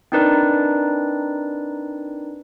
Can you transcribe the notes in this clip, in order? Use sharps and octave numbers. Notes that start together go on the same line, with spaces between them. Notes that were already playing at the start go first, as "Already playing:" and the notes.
C4 D4 D#4 A#4 B4 D5